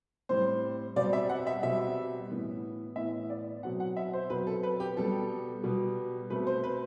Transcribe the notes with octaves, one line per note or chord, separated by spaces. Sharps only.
A2 G3 C4 C5
B2 G3 C4 D5
E5
F#5
E5
B2 G3 C4 E5
A2 E3 B3
A2 E3 B3 E5
D5
B2 F#3 C4 F#5
F#5
E5
C5
B2 F#3 C4 B4
A4
B4
G4
B2 G3 B3 A4
B2 G3 B3
B2 A3 C4 B4
C5
B4